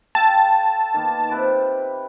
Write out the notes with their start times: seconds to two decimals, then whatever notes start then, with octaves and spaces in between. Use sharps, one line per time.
0.15 A4 F5 G5 A5
0.94 D#3 A#3 B3
1.29 C3 B4 D6